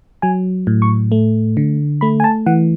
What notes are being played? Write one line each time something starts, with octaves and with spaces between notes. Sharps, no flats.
F#3 G#5
A2
C#6
A3
D3
A3 B5
G#5
A5
E3 F#5